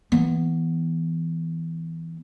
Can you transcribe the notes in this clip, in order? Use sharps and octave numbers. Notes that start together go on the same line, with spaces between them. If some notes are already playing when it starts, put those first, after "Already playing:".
E3 B3